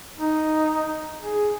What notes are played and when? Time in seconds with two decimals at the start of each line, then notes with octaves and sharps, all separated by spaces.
0.18 D#4
1.20 G#4